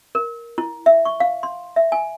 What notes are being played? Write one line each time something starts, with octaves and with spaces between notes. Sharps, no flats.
A#4
E4
E5
C#6
F5
C6
E5
G#5